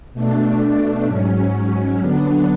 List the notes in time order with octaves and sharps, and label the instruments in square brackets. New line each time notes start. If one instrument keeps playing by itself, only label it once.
[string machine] B2 A3 D4
G#2 F#3 C#4
D3 F#3 B3 D4